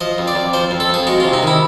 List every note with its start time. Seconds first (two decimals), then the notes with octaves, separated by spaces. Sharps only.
0.01 F3 D#5
0.18 F2
0.28 D5
0.35 F2
0.53 F3 C5
0.71 F2
0.80 A4
0.89 F2 G#4
1.07 G#3 F#4
1.20 F4
1.25 C3
1.33 D#4
1.43 D#3 E4